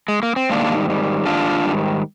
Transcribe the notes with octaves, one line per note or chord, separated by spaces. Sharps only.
G#3
A#3
C4
G#2 D#3 G3 A#3 D4
G#2 D#3 G3
G#2 D#3 G3 D4 F4
G#2 D#3 G3